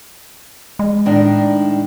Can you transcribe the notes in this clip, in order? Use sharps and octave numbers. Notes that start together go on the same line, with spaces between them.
G#3
A2 D#3 D4